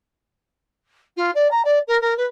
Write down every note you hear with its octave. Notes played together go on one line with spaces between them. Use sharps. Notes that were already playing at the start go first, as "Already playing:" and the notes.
F4
D5
A#5
D5
A#4
A#4
B4